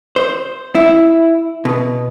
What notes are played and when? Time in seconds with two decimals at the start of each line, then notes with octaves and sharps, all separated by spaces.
0.16 C5
0.75 E4
1.65 B2